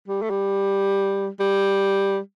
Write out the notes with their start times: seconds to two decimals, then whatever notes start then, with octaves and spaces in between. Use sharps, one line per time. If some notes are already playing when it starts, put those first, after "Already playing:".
0.08 G3
0.22 A3
0.30 G3
1.40 G3